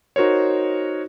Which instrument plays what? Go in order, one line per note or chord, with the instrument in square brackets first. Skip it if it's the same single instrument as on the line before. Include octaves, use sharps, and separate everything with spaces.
[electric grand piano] D#4 F#4 A#4 C5 C#5